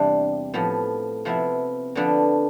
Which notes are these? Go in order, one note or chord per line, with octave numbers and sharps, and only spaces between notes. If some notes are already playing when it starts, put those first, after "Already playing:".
Already playing: E2 C3 G3 D4
A2 F3 B3
C3 F3 B3 E4
D3 F3 B3 D4